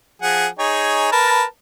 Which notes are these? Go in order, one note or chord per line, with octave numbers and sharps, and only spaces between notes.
F3 G#4 F#5
D#4 G#4 C#5
A#4 B4 A5